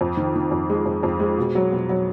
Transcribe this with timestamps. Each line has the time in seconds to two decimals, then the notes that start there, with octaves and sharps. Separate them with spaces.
0.01 F2
0.17 D#3
0.35 D#3
0.51 F2
0.70 G#3
0.86 F2
1.03 F2
1.20 G#3
1.38 B2
1.55 F#3
1.72 B2
1.89 F#3